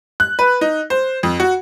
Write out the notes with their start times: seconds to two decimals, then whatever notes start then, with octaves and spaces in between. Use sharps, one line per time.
0.20 F#6
0.39 B4
0.61 D#4
0.90 C5
1.23 F2
1.40 F#4